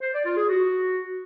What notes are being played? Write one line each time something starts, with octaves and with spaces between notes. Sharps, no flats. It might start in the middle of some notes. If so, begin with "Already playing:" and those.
C5
D5
F4
G#4
F#4